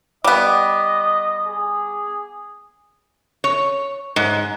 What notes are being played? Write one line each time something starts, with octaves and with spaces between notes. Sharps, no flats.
G3 B3 D#5 D6
G#4
C#5
G#2